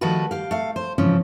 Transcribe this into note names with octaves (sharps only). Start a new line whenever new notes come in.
D#3 F3 G3 A3 F#4 B4
G4 F5
A3 F5
C5
G#2 C#3 E3 F3 C#4